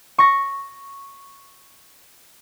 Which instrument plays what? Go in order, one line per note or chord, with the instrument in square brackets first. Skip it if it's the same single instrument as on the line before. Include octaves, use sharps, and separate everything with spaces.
[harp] C#6 A#6